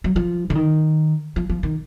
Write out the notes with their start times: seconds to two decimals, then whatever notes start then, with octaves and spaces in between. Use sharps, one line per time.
0.04 F#3
0.16 F3
0.50 D3
0.55 D#3
1.36 F3
1.49 F3
1.63 D#3